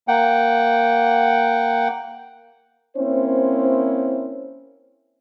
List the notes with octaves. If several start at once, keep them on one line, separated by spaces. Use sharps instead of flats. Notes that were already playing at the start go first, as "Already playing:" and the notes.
A#3 F#5 G5
A#3 C4 C#4 E4 C5 C#5